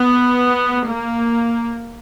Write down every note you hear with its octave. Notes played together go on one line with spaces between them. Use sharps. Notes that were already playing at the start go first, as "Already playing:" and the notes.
Already playing: B3
A#3